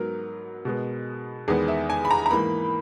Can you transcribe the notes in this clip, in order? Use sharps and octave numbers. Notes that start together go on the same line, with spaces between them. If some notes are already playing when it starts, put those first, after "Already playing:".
Already playing: G#2 F#3 B3 A#4
B2 G#3 B3
E2 D#3 G#3 B3 G#4
E5
G#5
B5
A#5
A#5
G#2 E3 A#3 B5